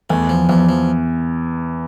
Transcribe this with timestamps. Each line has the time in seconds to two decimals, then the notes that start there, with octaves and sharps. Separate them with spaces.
0.10 E2 A3
0.29 F3
0.49 E2 F3
0.69 F3